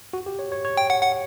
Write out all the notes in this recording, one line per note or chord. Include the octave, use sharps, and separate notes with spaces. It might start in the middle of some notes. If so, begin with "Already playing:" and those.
F#4
G4
C#5
C#5
C#5
G5
F#5
F#5